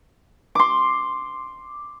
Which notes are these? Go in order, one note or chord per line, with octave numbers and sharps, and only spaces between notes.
C6 D6